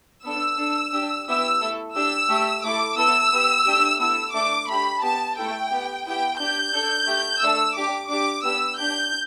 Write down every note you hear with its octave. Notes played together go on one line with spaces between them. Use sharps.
B3 D4 A4 E6
D4 A4
D4 G4
B3 E4 G4 E6
A3 E4 A4
D4 G4 E6
A3 G4
A3 E4 A4 D6
B3 E4 A4 E6
B3 G4
A3 D4 G4
B3 E4 A4 E6
A3 D4 A4 D6
A3 D4 G4 B5
B3 G4 A5
A3 E4 A4 G5
B3 G4
B3 E4 G4 G5
D4 G4 G6
D4 A4
A3 G4
A3 D4 A4 E6
D4 G4 D6
D4 G4 D6
B3 D4 G4 E6
D4 G4 G6